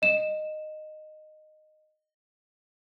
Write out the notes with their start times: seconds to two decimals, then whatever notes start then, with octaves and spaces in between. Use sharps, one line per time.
0.02 D#5 E7